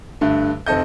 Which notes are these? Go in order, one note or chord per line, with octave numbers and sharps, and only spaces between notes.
G2 D3 A3
F1 C4 A4 D#5 G6